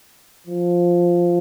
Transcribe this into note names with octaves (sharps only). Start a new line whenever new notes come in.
F3